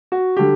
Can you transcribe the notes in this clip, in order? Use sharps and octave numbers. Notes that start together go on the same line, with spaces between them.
F#4
D3 G3 G4